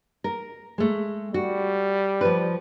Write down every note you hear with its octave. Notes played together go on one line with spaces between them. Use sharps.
A#4
G#3 A3
G3 F#4
F3 B4